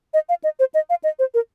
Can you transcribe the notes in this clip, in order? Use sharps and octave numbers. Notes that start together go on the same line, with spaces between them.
D#5
F5
D#5
C5
D#5
F5
D#5
C5
A#4